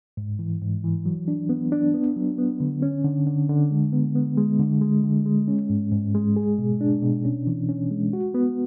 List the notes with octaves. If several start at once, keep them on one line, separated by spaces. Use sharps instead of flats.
G#2
E3
G#2
E3
F#3
D4
B3
D4
B3
F#3
B3
D3
C#4
D3
D3
D3
G#3
B3
B3
G#3
D3
G#3
D3
G#3
C#4
G#2
G#2
G#3
G#4
B2
D4
B2
C#4
E3
C#4
G#3
F#4
B3